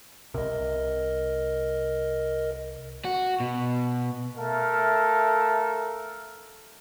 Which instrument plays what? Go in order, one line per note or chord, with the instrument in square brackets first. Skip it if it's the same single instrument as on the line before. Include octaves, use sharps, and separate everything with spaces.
[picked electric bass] C2 C3 [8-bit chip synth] A#4 D#5
[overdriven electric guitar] F#4
B2
[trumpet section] A3 A4 A#4 E5 F5 A5